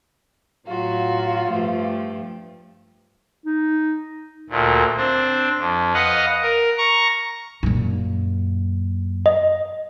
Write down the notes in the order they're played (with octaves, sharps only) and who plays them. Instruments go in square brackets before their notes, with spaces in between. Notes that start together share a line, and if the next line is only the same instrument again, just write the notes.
[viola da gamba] A2 F#3 F#4 [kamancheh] F4
[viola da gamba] G2 F3 A3
[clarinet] D#4
[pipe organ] D2 A#2
C4 D4
F2
B4 D#5 F5 F#5
A#4
A#5 C#6
[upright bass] F#2 A#2
[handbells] D#5